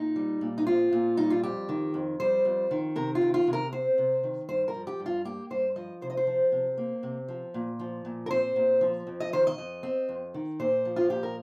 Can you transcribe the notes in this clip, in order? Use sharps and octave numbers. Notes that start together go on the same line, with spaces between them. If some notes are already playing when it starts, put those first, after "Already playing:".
Already playing: A#2 D#4
G3
A#2
D#4
C4 F4
A#2
G3 D#4
F4
F2 G4
D#3
F2
G3 C5
F2
D#3
C3 A#4
F4
D#3
F4
C3
A#4
C4 C5
C3
D#3
G2 C5
A#4
F3
G4
G2
F4
A#3 G4
G2 C5
F3 D#5
C3 C5
D#5
C5
F3
C3
A#3
C3
F3
A#2
F3
A#2
A#4
C4 C5
A#2
F3
F2
D#5
D#3 C5
D#5
F2
C4
F2
D#3
A#2 C5
F3
F4
A#2 G4
A#4